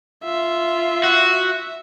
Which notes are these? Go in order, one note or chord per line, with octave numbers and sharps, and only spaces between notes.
F4 E5
F#4